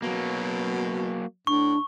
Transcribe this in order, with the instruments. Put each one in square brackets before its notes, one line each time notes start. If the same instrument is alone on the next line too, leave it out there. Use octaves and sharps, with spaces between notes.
[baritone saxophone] B2 [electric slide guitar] F#3 A#3
[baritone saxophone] A2 [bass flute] D4 [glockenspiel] C#6